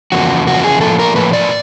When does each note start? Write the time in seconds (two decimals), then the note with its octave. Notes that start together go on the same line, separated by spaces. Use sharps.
0.12 E2 C#3 F3 A#3 F#4
0.47 E2 C#3 F3 A#3 F#4
0.64 G#4
0.81 A2 F3 A#3 A4
0.99 A#4
1.16 A2 F3 A#3 B4
1.33 D5